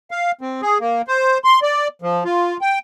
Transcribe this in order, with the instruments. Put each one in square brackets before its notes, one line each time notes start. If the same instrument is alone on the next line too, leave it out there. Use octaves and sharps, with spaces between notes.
[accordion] F5
C4
G#4
A#3
C5
C6
D5
F3
F4
G5